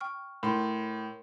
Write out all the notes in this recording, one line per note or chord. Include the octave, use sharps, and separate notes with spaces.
G5 C#6 F6
A2 A#4 C6